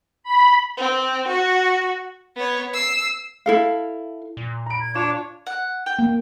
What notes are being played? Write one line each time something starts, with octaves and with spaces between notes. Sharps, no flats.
B5
C4
F#4
B3 C#5
E6 C7
E4 A4 F5
A#2
A#5 B5 D7
G#6
D4 F4 C#5 D6 E7
F#5
G5
A#3